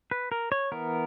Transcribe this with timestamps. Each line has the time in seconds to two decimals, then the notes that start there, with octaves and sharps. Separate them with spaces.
0.11 B4
0.32 A#4
0.52 C#5
0.72 E3 B3 A#4